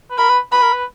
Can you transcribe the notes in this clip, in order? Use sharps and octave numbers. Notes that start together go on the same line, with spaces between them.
B4
A#4 B5
B4
B4 B5
A#4
B4